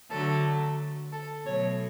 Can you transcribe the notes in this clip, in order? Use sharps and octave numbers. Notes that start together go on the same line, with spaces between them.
D3 F#3 A3 A4
A4
B2 F#3 A3 C#5